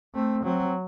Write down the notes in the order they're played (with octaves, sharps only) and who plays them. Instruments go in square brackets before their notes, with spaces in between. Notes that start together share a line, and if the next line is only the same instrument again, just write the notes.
[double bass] A3 [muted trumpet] C4
[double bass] F#3 [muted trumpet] C4